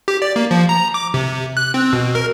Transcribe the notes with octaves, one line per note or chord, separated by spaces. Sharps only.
G4
D5
A#3
F3
A#5
D6
C3
F#6
C4
B2
A#4